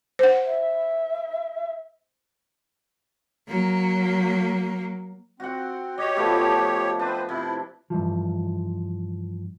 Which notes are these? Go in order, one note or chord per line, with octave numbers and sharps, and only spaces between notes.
C5 F#5
E5
F#3 A#3
C4 F#4 F#5
G4 C#5 D#5
F3 A3 B3
C4 D4 B4 C5
C3 E4
G2 E3 F3